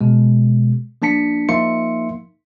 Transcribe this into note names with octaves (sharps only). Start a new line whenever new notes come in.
B2 G#3
F3 A#3 D4 A5 B6 C#7
F3 A#3 D#4 E5 C6 C#7